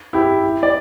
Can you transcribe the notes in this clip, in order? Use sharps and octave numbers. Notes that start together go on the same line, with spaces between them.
E4 G4
D5